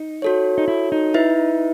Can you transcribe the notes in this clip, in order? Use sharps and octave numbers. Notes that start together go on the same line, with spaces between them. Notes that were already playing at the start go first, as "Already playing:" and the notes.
Already playing: D#4
F#4 A4 C#5
D#4
E4
D#4
E4 B4 E5